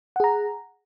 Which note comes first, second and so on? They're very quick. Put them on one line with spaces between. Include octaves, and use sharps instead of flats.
F#5 G#4 A#5